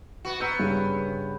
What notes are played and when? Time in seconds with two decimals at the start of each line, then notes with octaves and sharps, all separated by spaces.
0.25 B3 F#4
0.40 B3 A#5 E6 G6
0.59 G2 C#3